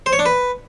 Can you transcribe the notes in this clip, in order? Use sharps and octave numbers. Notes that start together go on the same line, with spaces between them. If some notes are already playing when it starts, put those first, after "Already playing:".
C5
C#5
D4
B4